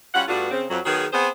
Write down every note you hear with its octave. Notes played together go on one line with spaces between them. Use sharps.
G3 C#4 F4 F#5
G2 A3 B3 D4 F4 F#4
C#3 C4
F2 F#3
D#3 F#3 B3 G#4
B3 C4 G#4 C5